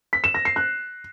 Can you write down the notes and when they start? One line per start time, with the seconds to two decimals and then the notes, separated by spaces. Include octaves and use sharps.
0.13 B6
0.24 E7
0.34 A#6
0.45 C7
0.56 F#6